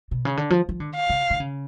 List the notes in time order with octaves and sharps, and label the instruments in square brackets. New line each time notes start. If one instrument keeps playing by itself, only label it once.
[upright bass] B2
C#3
D3
F3
F3
D3
[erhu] F5
[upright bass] C#3
D3
C#3